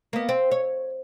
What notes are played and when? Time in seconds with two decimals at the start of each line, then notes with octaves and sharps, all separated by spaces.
0.13 A#3 B3
0.29 C4
0.51 C#5